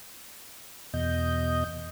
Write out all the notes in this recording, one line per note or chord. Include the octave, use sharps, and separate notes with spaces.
E2 B2 D#5 G6